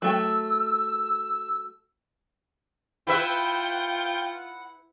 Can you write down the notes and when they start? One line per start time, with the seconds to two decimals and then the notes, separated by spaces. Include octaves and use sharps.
0.02 F#3 A3 G5 E6
3.07 E4 F4 B4 E5 F#5 G5